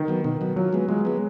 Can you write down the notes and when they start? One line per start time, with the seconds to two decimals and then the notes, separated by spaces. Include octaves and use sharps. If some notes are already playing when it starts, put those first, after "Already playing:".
Already playing: D#3
0.08 F#3 B3
0.24 B2 D#3
0.41 F#3 B3
0.56 F3 F#3
0.73 G#3 B3
0.89 F3 G#3
1.05 G#3 B3